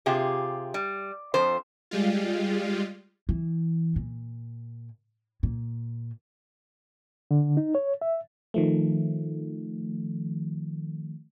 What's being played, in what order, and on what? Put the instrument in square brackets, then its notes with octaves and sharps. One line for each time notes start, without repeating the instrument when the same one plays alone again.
[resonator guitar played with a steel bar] C3 F4 G4 G#4
G3
F2 F3 C5
[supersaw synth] G3 G#3 F4
[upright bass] E3
A#2
A#2
[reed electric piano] D3
D#4
C#5
E5
[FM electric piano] D#3 F3 A3